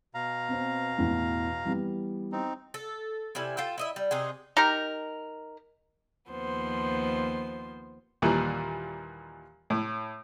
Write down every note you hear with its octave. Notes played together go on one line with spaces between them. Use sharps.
B2 F5 A#5
B3 C4
E2 A2 E3
E3 G3 B3
C4 D#4
A4
C3 G3 E4 G#5
F4 A4 G5
E4 D#5 E5
G3
C3 D#4 G#4
D#4 G4 A#4
D#2 F3 B3 C5
D#2 A#2 E3 G3
A2